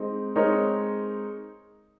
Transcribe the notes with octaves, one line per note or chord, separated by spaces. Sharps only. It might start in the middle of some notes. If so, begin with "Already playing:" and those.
Already playing: G#3 C4 D#4
G#3 C4 D#4 A#4 C#5